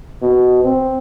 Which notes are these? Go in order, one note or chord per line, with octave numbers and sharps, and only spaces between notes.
B2
C4